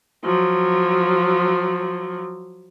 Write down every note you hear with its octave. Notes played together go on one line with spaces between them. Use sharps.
F3 F#3